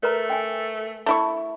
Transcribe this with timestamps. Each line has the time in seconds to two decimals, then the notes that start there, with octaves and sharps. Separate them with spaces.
0.03 A3 A#4 B4 A#5
0.30 G5 G#5
1.06 A3 E4 C#6